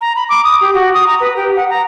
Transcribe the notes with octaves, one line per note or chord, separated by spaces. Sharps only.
A#5
B5
D6
D#6
G4
F#4
D#6
A#5
B4
G4
F#5
A#5